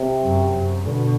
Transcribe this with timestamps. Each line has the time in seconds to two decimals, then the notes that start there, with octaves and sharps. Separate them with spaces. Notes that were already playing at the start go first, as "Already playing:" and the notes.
Already playing: C3
0.23 F#2
0.55 F#2
0.85 B2 D3